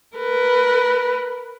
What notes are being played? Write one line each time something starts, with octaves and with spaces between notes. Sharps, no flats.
A#4 B4